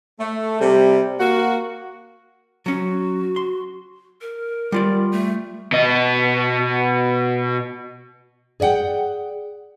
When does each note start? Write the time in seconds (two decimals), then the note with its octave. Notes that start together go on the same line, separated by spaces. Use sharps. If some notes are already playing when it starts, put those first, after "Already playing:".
0.19 A3
0.59 C3 G3
1.18 A#3 F#4
2.66 F#3 C#4 F#4
3.36 C6
4.21 A#4
4.72 G3 F4 D5
5.12 A3
5.72 B2 D#5
8.60 G#4 D5 D#5 F#5 G5